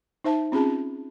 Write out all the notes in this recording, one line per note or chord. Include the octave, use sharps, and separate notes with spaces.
D#4 C5 E5 A5
C4 C#4 F4 G#4 A5